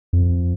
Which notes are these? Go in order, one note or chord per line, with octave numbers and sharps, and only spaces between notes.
F2